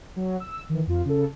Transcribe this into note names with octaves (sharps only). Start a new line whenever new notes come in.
F#3
E6
D#3 E3
F2 F4
C#3 A4